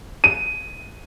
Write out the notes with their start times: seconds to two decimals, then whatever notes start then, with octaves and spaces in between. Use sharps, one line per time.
0.24 D#7